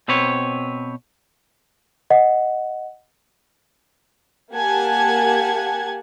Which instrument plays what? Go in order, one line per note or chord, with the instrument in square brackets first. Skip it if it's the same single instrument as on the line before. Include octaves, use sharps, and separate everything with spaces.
[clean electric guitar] B2 C4 B4 C#5
[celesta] D#5 F#5
[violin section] A#3 G4 F#5 G#5 A5 G#6